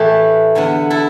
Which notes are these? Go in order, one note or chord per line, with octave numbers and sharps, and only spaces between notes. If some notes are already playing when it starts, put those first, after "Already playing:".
Already playing: A2 E3 A3 G4 B4
E2 D3 B3
E4 A4